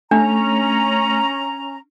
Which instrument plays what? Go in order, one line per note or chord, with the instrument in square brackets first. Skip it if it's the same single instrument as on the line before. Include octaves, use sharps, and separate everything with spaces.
[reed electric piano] A3 [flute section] C#4 A#5 [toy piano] D4